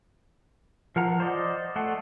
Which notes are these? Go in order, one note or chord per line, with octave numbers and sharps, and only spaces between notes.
F3 A#4 F#5 A#5
C5 D5 D#5
A3 F#5 A5 C6